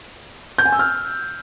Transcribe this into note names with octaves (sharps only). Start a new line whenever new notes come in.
G6
G#5
E6
F6